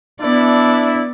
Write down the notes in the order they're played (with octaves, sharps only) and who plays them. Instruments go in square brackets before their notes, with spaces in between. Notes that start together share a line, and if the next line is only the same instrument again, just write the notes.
[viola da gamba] B3 D5 [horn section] D4 E4